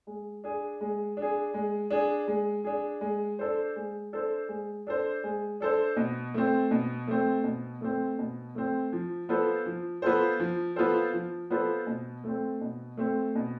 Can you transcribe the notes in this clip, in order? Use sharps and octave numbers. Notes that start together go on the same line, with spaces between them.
G#3
D4 G#4
G#3
D4
G#4
G#3
D4 G#4
G#3
D4 G#4
G#3
D4 A4 C5
G#3
D4 A4 C5
G#3
D4 A4 C5
G#3
D4 A4 C5
B2
A3 C4
B2
A3 C4
B2
A3 C4
B2
A3 C4
F3
B3 F4 A4 C5
F3
B3 F4 A4 C5
F3
B3 F4 A4 C5
F3
B3 F4 A4 C5
B2
A3 C4
B2
A3 C4
B2